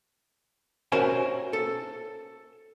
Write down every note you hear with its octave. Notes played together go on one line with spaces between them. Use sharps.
C#4 F#4 A#4 C5 E5 G#5
A4